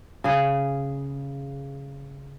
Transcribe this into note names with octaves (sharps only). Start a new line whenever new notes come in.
C#3 G#4